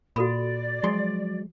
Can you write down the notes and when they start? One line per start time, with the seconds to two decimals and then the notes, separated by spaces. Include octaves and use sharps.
0.16 A#2 F#4 A4 D5 B5
0.84 F3 F#3 G#3 C6